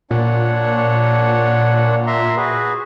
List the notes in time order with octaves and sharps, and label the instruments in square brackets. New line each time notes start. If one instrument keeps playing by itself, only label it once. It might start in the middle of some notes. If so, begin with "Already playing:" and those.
[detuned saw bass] A#2 [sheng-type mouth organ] D4 C#5 F#5
[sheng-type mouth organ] E5 A#5 C6
F#4 G#4 B4